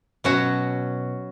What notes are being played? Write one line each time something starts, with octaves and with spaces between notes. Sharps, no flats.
B2 F#3 C#4 F#4